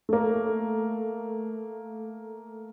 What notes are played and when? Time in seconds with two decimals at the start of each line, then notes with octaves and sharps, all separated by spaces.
0.09 A3 A#3